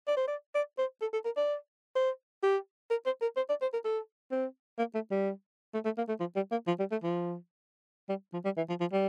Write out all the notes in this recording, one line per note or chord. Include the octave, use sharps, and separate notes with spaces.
D5
C5
D5
D5
C5
A4
A4
A#4
D5
C5
G4
A#4
C5
A#4
C5
D5
C5
A#4
A4
C4
A#3
A3
G3
A3
A3
A#3
A3
F3
G3
A#3
F3
G3
A3
F3
G3
F3
G3
E3
F3
F3
G3